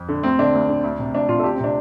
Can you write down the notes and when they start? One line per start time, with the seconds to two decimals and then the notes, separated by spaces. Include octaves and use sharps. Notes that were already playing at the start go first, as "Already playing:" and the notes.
Already playing: F2
0.09 D3
0.23 D2 C4
0.39 D3 D4
0.54 D2
0.69 D3
0.84 D2
0.99 C3
1.13 D2 D4
1.29 C3 F4
1.39 A4
1.44 D2 G4
1.54 C4
1.60 C3 D4